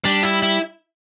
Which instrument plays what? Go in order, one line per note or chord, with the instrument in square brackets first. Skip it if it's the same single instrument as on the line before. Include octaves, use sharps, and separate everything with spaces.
[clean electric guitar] G3 [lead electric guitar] D4
[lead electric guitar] E4
E4